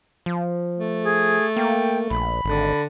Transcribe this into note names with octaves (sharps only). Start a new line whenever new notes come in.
F3
A3
G#4
A#3 G5
A#1 B5
G#1 D3